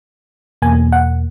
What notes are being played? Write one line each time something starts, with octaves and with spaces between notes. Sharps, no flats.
E2 B2 A#3 G#5
F#5